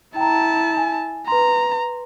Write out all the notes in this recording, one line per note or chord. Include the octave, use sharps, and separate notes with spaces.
E4 G5 A5 A#5
G#5
B4 A#5 C6